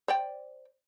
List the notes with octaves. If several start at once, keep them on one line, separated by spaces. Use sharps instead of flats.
C5 D5 G5